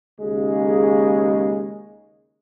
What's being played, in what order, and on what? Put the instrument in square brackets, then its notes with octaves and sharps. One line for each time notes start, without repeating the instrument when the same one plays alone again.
[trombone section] D#2 C#3 G#3